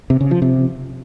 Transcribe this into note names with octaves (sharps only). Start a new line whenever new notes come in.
C3
C#3
F3
C3